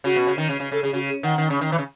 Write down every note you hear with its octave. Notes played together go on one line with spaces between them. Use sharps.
C#3 F#4
B2
C#3
D#3
C#3
C#3
C#3 A4
C#3 G#4
C#3 F#4
G#4
D#3 F#5
D#3
C#3
D#3
E3
C#3